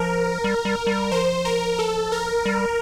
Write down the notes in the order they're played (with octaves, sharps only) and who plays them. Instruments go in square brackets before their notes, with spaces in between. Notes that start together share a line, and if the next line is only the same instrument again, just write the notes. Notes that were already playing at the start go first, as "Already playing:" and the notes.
Already playing: [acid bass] F3 [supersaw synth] A#4
[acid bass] G3
G3
G3
[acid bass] F3 [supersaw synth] C5
[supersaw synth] A#4
A4
A#4
[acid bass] G3